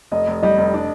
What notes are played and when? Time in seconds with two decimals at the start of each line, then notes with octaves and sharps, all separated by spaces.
0.11 F1 D#5
0.27 F1
0.43 G3 D#5
0.58 F1
0.74 D4